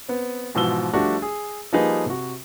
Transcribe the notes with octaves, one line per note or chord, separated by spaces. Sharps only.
B3 C4
G#2 B2 E3 F3 E6 G7
F3 G3 A3 D4 F#4
G#4
F3 G3 A#3 D#4 G#4 B4
C3 F#4